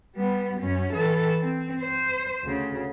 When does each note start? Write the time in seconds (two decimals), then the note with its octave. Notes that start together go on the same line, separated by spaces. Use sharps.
0.16 G3 B3
0.61 F#2 C#4
0.93 E3 A4
1.39 C4
1.81 C5
2.44 D2 C#3